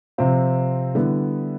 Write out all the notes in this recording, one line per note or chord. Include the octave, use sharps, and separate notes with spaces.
C3 F3 C4 F4
D3 G3 B3 E4